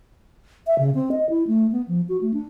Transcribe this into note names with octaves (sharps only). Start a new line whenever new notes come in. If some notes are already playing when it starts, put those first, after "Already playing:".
E5
C#3
C4
D#5
E4
A3
B3
F3
F#4
A3
D4